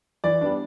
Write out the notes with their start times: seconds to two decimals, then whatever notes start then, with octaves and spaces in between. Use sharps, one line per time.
0.24 E3 D5
0.41 G3 B3 D4